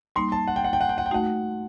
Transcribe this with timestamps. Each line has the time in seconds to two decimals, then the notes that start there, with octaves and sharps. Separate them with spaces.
0.16 G3 A#3 D#4 C6
0.32 A5
0.47 F#5
0.56 G5
0.64 F#5
0.73 G5
0.81 F#5
0.89 G5
0.98 F#5
1.06 G5
1.11 A3 D#4 F#4 F#5